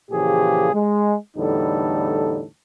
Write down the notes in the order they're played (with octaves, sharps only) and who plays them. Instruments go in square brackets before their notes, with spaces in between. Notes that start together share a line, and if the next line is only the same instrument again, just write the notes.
[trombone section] A#2 C#3 E3 F3 G4 G#4
G#3
E2 A2 D3 G3 D#4 A4